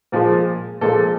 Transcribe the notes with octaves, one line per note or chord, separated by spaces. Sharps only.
A#2 F3 G#3
A#2 F3 G#3 A4